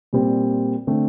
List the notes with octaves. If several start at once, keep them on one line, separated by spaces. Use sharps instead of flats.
A#2 G3 C4
D3 A3 C4